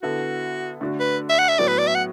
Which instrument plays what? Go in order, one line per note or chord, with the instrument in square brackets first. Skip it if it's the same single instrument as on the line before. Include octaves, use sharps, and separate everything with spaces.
[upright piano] D3 B3 E4 A4 [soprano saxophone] F#4
[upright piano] D3 A3 D4 F#4
[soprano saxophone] B4
E5
F#5
E5
[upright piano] A2 F#3 B3 [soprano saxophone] D5
[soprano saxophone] B4
D5
E5
F#5